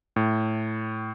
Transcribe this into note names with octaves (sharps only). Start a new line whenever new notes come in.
A2